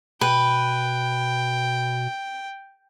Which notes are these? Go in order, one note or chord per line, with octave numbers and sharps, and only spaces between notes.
B2 B4 G5